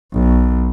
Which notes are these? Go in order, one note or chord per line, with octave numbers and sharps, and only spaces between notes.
B1